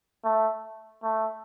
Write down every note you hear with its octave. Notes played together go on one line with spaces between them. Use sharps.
A3
A3